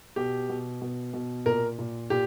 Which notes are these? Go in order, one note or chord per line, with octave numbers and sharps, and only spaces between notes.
B2 G4
B2
B2
B2
A#2 A#4
A#2
A#2 G4